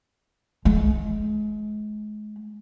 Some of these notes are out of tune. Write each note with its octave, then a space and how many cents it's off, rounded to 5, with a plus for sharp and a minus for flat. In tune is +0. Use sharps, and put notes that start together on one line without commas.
G#3 +30